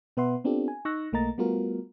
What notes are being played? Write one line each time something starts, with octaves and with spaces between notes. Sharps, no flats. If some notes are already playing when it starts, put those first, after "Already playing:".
B2 B3 B4 E5 F#5 C6
B3 C4 D4 F4 G4 A4
G#5
D#4 C#6 E6 F#6 A#6
B1 A3 A#3 D#5 A#5 A6
G3 A3 B3 F4 F#4 A#4